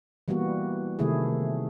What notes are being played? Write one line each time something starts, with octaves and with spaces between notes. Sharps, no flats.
E3 G3 A#3 B3 F#4
C3 D#3 A3 E4 G#4